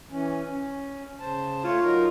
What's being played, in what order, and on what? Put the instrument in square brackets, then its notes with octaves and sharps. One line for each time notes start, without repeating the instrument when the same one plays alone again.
[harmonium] E3 C#4
C#4
C#3 C5 A5
[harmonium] A3 C#5 [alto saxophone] F4
[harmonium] F#3 D#4 A#4